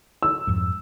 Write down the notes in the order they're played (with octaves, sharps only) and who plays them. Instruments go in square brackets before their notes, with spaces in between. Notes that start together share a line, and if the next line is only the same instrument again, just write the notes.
[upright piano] E6
[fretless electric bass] F2 G#2